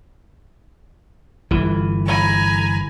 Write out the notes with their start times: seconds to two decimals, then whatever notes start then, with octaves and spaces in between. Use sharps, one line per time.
1.51 G1 E3
2.06 G#5 A#5 B5